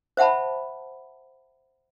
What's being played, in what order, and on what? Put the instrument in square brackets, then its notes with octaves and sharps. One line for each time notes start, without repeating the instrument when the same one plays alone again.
[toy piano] C5 E5 F#5 A5 B5